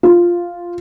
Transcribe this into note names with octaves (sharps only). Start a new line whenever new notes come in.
F4